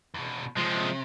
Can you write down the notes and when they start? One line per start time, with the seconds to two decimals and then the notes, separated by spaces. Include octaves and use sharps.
0.14 E2 B2
0.57 C3 F3 G#3